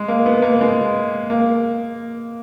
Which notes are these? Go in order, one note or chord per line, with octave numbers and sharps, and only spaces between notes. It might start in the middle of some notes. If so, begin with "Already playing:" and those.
Already playing: G#3
A#3
B3
A#3
G#3
A#3